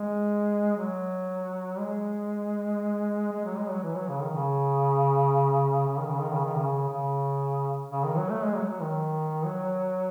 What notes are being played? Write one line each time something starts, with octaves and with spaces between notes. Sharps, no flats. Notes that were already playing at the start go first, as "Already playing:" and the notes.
Already playing: G#3
F#3
G#3
G#3
F#3
G#3
F#3
E3
F#3
C#3
D#3
C#3
C#3
D#3
C#3
D#3
C#3
D#3
C#3
C#3
C#3
D#3
F#3
A3
G#3
F#3
F#3
D#3
F#3